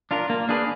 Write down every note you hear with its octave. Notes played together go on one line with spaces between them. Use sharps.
D4 F4 A#4
A#3
D4 G#4 B4